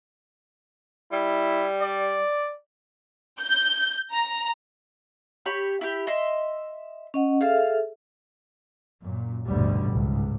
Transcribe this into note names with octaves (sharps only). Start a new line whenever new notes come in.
G3 E4
D5
G6
A#5
G4 C#5 B5
E4 G4
D#5 E5 C6
C#4 D#5 F#5
G#4 A4 E5 F5
F#2 A#2
A1 D2 G2 B2 D3 G3
C#2 G#2